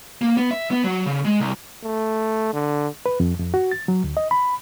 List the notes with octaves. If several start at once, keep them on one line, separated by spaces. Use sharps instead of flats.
A#3
B3
E5
B3
F#3
C#3
G#3
C2
A3
D3
B4
F2
F2
F#4
A6
F#3
D2
D#5
B5